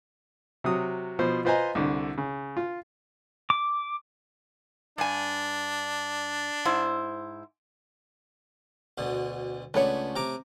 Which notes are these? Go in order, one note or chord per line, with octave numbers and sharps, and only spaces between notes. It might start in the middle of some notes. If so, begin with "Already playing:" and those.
C3 F#3 D#6
B2 F3 C5
F4 B4 C5 D#5 G#5 A#5
C2 D3
C#3
F4
D6
G2 D4 G#5
G#2 E4 C5
D2 B2 D3
C#2 A3 B3 D4 C#5
C3 A#5 D6